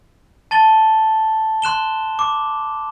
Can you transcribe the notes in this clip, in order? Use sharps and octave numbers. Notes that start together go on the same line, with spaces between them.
A5 A6 G7
C6 F#6 E7 G7
D6